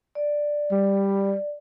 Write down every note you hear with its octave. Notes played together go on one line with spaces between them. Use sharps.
D5
G3